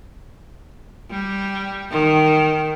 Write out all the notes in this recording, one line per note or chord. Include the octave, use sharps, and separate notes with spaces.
G3
D#3